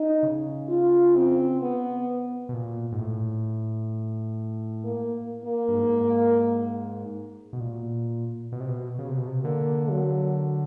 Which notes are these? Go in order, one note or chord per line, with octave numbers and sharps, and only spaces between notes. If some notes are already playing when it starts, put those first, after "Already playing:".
Already playing: D#4
C#3
F4
C4
B3
B2
A#2
G#2
A2
A#3
A#3
G2
G#2
B2
A#2
B2
C3
B2
C#3
C3
B2
C3
D3 A#3
F#3